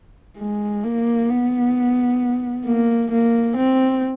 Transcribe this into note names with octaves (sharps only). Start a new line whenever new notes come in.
G#3
A#3
B3
A#3
A#3
C4